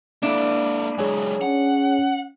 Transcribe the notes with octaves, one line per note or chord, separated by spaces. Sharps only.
A#3 D4 E4 A4
F#3 G#3 G#4 C#5 G#5
C#4 F#5